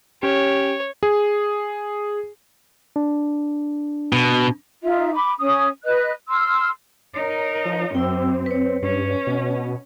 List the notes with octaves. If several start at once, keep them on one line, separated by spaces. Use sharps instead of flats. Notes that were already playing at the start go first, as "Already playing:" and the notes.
C#4 G4 C#5
G#4
D4
B2
D#4 F4 E5
B5 D6
C#4 D#6
B4 D#5 F#6
C6 E6 F6
D#4 A#4 C#5
F3
F#2 C4 G5 E6
B4 C#5
G2 C#4
B2